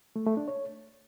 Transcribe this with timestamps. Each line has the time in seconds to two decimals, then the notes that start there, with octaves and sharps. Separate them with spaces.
0.16 A3
0.26 A3
0.37 D4
0.48 C#5